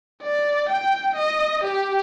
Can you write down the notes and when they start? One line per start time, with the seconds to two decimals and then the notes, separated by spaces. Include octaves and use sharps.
0.22 D5
0.69 G5
1.16 D#5
1.64 G4